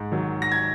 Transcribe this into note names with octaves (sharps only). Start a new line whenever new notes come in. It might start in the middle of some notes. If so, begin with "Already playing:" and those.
Already playing: G#2
D#3 F#3
A#6
G#6